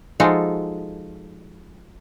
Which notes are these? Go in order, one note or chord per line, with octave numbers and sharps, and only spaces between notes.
F3 G#3 D#4 F4 F#4 A4